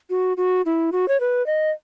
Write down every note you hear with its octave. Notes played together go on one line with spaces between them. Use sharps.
F#4
F#4
E4
F#4
C#5
B4
D#5